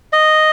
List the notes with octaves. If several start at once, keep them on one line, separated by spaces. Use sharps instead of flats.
D#5